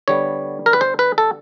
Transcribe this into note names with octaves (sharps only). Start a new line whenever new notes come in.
D3 G3 B3 C#5
A#4
B4
C5
B4
A4